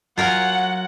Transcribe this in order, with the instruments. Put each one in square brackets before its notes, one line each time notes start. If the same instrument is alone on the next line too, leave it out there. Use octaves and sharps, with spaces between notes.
[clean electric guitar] F#3 [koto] F4 A#4 G#5 [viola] F#5